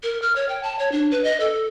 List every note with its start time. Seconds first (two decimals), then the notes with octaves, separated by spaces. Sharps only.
0.03 A#4
0.22 F6
0.36 C#5
0.49 G5
0.63 A5
0.79 C#5
0.92 D4
1.11 B4
1.24 D#5
1.40 A4